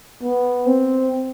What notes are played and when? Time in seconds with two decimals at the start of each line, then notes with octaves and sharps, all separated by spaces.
0.23 B3
0.66 C4